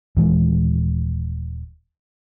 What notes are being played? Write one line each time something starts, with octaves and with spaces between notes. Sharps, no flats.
D#1 E3 G#3